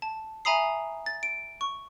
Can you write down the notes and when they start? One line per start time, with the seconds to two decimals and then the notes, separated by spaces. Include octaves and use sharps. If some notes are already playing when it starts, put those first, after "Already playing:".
0.02 A5
0.45 E5 G#5 A#5 B5 D#6 C7
1.06 A6
1.23 D7
1.61 C#6